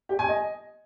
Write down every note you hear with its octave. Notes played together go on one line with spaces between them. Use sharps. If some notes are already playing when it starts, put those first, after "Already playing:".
G4
G#5
D#5